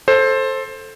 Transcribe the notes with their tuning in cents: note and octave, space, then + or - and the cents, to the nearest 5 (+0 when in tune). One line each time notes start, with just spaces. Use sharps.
A4 +0 C5 +15